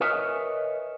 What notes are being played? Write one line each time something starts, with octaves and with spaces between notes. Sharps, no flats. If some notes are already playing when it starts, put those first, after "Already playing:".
A#4 B4 C#5 D#5 E5 G#5